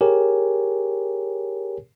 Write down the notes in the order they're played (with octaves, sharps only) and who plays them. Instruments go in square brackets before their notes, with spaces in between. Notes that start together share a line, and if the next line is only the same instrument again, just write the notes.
[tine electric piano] G4 G#4 A#4 C#5 G#5